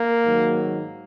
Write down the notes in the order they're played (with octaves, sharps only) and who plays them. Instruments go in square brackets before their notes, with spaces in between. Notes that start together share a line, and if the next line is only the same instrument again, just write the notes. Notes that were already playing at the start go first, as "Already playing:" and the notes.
Already playing: [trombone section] A#3
G#2 D#3 F#3